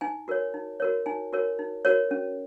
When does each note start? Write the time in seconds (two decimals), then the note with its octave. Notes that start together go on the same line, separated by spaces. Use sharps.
0.01 D#4 G#5
0.28 F#4 A#4 C#5
0.54 D#4
0.80 F#4 A#4 C#5
1.06 D#4 G#5
1.33 F#4 A#4 C#5
1.59 D#4
1.85 F#4 A#4 C#5
2.11 C#4